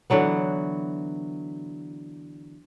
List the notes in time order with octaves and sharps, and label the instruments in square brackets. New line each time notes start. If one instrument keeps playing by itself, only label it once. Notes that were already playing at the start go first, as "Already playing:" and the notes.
[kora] D3 E3 F#3 B3